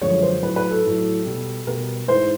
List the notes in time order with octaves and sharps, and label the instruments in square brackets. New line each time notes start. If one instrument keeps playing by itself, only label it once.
[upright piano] F#2 D3 F3 G#3 C#5
C5
A2 F#3 B4
B4
A4
A2 F#3
B2 G3
B2 G3 A#4
G#2 E3 G#3 C5